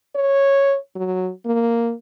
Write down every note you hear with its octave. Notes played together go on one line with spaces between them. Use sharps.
C#5
F#3
A#3